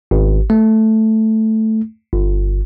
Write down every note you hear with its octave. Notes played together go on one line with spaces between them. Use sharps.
G#1
A3
G1